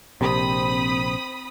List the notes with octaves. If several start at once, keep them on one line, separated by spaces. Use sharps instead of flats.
A#1 C3 C4 B5 D#6